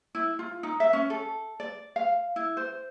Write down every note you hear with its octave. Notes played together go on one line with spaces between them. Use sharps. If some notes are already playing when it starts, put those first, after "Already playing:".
E4
F4
D#4
E5
C#4
A4
D5
F5
E4
C5